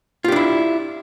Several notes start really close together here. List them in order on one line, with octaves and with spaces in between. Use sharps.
F4 G4 D4 E4